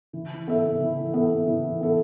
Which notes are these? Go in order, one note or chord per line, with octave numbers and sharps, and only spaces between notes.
E3
B3 A4 E5
E3
B3 A4 E5
E3
B3 A4 E5